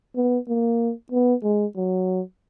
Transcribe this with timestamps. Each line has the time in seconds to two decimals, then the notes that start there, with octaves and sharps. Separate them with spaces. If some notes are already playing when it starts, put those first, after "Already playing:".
0.16 B3
0.48 A#3
1.12 B3
1.43 G#3
1.76 F#3